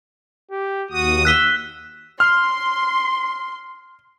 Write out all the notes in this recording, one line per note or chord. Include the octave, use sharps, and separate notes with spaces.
G4
D#2 F#4 D#6
E6 F#6 B6 G7
C6 F6